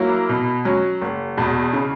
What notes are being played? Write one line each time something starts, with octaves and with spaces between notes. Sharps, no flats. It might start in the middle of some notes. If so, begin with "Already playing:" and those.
Already playing: F#3 A#3 E4 A#4
B2
F#3 C#4
F#1
E2 B2
C#3